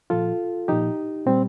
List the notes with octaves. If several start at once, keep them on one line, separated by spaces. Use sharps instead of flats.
A#2 F3 F4 A4
A#2 F3 D#4 G4
A#2 G3 C4